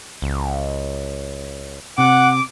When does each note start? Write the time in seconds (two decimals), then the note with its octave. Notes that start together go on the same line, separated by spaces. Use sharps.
0.22 C#2
1.98 C3 F#5 D6